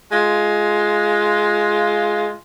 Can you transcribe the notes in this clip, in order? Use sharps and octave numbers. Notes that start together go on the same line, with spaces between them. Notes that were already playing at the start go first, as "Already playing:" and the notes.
G#3 F4